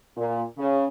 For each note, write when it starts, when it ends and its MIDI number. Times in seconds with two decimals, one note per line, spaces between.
0.17 0.42 46
0.58 0.85 49